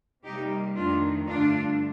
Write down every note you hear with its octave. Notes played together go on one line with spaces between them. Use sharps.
C3 G3 A#3 D#4 G4
F2 D#3 A3 D4 F4
G2 D3 A3 D4 F4